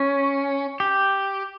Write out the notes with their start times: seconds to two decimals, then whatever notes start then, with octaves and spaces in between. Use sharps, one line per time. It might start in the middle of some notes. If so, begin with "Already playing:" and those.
Already playing: C#4
0.80 G4